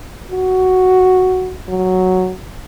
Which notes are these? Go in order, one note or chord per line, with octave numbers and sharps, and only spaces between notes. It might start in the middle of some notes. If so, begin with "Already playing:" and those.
F#4
F#3